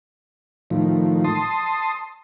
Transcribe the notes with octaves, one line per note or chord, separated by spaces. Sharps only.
A2 D#3 F3
A5 C6 D#6